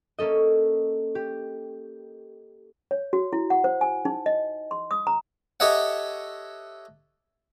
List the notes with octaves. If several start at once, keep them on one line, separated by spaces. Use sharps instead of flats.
A#3 C#4 A4 D#5
G4
C#5
F#4
E4
F#5
C5
G#5
D#4
D#5
C6
D#6
A#5
G4 A4 C#5 D#5 E5 F#5